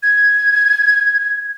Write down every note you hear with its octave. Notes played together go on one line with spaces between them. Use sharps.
G#6